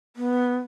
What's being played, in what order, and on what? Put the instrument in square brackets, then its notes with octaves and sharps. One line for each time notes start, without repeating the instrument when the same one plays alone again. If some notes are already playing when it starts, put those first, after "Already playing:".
[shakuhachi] B3